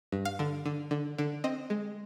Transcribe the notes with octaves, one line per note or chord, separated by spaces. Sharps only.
G2
F5
D3
D3
D3
D3
C4 D#5
G#3